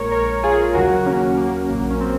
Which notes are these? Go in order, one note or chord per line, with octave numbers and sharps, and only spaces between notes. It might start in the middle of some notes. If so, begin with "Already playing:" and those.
Already playing: A#1 A#2 G#3 A#4 C#5
A#4 C#5
F4 G#4
D#2 C#3 F#3 F#4 A#4
A#3 C#4
A#3
A#1 A#2 F#3 A#3
C#4
C4